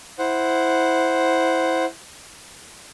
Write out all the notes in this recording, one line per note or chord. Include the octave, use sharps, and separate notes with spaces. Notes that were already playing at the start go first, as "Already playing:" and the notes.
E4 C5 F#5